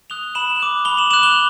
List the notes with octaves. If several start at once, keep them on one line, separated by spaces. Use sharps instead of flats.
D#6 F#6 F7 G7
B5 E7 F#7
D6 F#6
B5 F7 G7
E7 F#7
D6 F#6 E7 F#7
F7 G7